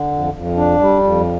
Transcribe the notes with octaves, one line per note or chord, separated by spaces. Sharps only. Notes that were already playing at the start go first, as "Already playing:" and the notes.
Already playing: D3
F2
F2
D4
G3
F2